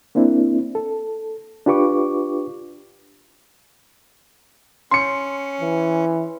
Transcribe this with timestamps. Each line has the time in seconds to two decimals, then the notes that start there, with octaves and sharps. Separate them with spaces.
0.15 A#3 C4 D4 E4
0.75 A4
1.66 D4 F4 G4 B4 C#6 D6
4.91 C#4 C6 C#7
5.61 E3